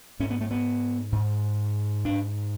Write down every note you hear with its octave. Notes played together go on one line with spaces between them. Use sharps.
G#2 C#4
B3
A3
B3
G#2
G#2 D4